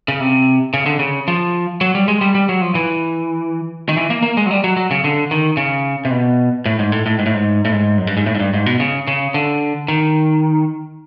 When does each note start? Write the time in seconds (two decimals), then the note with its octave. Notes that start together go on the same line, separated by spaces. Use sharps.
0.08 C#3
0.20 C3
0.74 C#3
0.86 D3
0.99 C#3
1.28 F3
1.81 F#3
1.95 G3
2.08 G#3
2.21 G3
2.35 G3
2.49 F#3
2.61 F3
2.75 E3
3.89 D#3
3.97 E3
4.10 A#3
4.22 A#3
4.37 G#3
4.46 F#3
4.51 G3
4.64 F#3
4.77 F#3
4.91 C#3
5.04 D3
5.31 D#3
5.57 C#3
6.05 C3
6.11 B2
6.66 A2
6.79 G#2
6.92 A2
7.06 A2
7.19 G#2
7.26 A2
7.34 G#2
7.65 A2
7.72 G#2
7.98 F#2
8.07 G2
8.17 G#2
8.26 A2
8.35 G#2
8.40 G2
8.54 G#2
8.66 B2
8.80 C#3
9.08 C#3
9.34 D3
9.88 D#3